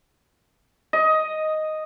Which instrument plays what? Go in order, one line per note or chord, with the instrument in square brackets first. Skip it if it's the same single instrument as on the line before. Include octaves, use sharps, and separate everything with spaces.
[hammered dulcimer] D#5